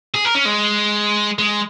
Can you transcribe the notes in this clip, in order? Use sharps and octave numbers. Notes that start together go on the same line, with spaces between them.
G#4
A#4
C#4
G#3
G#3